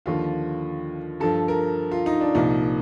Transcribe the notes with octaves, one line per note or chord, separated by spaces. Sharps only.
D#2 D3 F3 F4
G2 F3 A4
A#4
F4
D#4
D4
C2 A#2 F3 D#4